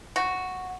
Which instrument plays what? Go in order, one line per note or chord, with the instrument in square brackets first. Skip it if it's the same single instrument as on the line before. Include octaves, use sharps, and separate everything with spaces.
[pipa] F#4